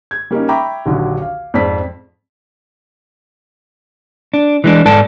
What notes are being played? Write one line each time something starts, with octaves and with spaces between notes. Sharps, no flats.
G#6
G3 A#3 C#4 D#4
E5 G5 A#5 B5 C#6 D6
A#1 D#2 D3 F#3
F5
F2 G#2 D5 A5 B6
D4
E3 G#3 D4
G#2 A4 D5 A5